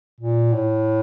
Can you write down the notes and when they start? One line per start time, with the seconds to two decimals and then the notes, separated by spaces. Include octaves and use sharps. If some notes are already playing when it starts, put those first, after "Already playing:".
0.20 A#2
0.53 A2